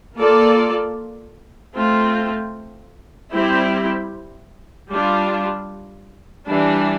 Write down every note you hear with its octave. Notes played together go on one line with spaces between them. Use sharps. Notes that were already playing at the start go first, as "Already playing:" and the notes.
A#3 F4 A4 D5
A3 C4 F4
G3 C4 E4 G4
G3 D4 F4
E3 G3 D4